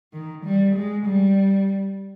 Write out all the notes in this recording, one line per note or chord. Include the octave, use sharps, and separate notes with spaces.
D#3
G3
G#3
G3